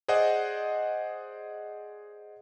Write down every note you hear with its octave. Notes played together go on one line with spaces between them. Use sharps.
G#4 C5 D5 D#5 F#5